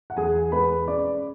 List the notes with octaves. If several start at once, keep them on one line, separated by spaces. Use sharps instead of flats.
F#5
E2 G#4 G#5
G#3 B4 B5
C#4 D5 D6